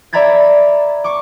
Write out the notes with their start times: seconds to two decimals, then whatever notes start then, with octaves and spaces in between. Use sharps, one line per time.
0.13 D5 E5 A#5 B5 G#6 A6
1.04 C#6 D6